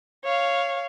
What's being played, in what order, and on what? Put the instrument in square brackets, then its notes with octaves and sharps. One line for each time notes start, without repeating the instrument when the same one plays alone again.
[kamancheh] C#5 F5